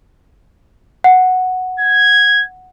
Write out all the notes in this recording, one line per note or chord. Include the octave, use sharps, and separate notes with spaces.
F#5
G#6